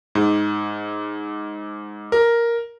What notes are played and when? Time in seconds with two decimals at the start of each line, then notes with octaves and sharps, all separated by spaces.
0.15 G#2
2.12 A#4